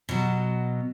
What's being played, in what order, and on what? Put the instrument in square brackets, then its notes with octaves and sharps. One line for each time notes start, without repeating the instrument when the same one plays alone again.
[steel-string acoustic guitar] B2 F#3